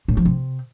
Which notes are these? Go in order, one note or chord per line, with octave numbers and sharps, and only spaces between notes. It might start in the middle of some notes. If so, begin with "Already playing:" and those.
A2
F3
C3